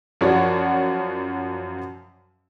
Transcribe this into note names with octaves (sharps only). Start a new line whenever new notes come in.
F#2 F3 F#4 C#5 D5 F#5